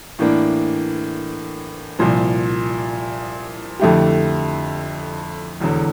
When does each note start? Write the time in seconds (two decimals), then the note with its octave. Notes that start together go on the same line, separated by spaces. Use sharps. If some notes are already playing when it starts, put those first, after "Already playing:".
0.19 A2 E3 A#3 D4
1.99 C2 A#2 F3
3.79 F2 D3 A3 E4 G4
5.60 E1 E2 D3